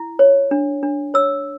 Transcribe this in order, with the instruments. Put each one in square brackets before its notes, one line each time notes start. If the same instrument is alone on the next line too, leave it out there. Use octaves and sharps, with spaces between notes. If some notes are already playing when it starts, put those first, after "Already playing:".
Already playing: [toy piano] E4
C#5
D4
D4
C#5 E6